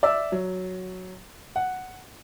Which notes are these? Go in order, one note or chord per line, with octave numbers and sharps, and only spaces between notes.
D5 E5 E6
F#3
F#5